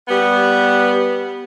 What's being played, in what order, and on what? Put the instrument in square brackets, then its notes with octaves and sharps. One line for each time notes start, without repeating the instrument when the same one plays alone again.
[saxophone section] G3 B3